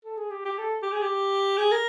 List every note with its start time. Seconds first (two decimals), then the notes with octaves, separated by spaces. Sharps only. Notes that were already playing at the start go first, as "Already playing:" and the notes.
0.05 A4
0.17 G#4
0.30 G4
0.45 G4
0.58 A4
0.82 G4
0.92 G#4
1.02 G4
1.58 G#4
1.72 A#4